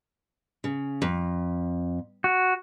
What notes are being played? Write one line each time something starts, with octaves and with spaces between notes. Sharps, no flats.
C#3
F2
F#4